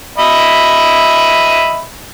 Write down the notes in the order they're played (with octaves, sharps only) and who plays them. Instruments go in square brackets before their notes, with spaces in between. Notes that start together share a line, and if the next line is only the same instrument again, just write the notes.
[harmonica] D#5 E5 B5